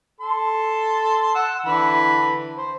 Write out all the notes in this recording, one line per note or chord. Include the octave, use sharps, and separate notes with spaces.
A4 A5 C6
F#5 E6
D3 E3 B5
C5